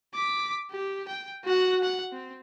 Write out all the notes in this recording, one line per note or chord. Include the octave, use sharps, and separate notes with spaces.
D6 B6
G4
G5
F#4 F#5
F#5
C4